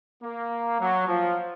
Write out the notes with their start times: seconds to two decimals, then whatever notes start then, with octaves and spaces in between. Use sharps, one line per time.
0.23 A#3
0.80 F#3
1.08 F3